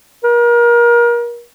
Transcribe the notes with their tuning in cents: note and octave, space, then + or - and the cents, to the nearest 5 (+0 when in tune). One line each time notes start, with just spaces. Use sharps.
A#4 +30